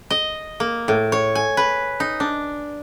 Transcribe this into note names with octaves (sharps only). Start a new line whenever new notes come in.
D#5
A#3
A2
C#5
G#5
B4
D#4
D4